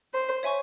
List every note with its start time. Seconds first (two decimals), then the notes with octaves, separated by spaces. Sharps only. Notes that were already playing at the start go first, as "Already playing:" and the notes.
0.14 C5
0.43 C#5 E5 G#5 C#6